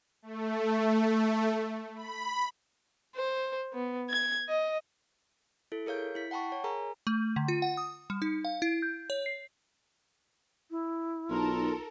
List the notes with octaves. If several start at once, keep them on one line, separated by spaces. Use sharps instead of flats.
A3
B5
C5
B3
G#6
D#5
E4 A4
G#4 A#4 C#5 F5 G6
E4 B6
F#5 G5 A5 B5 C#6
C#5
G#4 A#4 G#5 A#5
A3
D3
F4
F#5
D#6
G3
D#4
F5
E4
G6
C#5
C7
E4
B1 D#4 F4 A4 A#4 C6